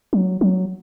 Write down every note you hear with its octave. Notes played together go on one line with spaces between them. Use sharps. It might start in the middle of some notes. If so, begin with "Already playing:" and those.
F#3
F#3